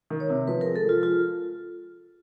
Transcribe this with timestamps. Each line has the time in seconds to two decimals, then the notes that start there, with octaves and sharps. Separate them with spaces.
0.10 D#3
0.20 C#5
0.30 C3
0.47 F3 B4
0.61 A#4
0.66 G#3
0.76 A4
0.85 F3 F4
1.02 G#3 F4